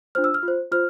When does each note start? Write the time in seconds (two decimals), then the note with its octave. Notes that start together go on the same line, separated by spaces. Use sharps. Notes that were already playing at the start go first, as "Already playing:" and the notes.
0.15 D4 F4 C5 F6
0.24 E6
0.34 F6
0.43 F4
0.48 C5
0.72 F4 C5 F6